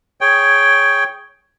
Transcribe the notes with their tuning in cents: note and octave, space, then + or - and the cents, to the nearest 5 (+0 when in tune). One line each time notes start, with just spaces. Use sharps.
G#4 +0 C#5 +5 G5 +0